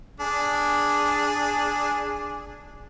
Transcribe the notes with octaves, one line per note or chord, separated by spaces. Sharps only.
D4 G#4